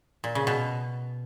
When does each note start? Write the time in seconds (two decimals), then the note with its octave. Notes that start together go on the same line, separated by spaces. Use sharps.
0.24 A#2
0.35 C#3
0.47 B2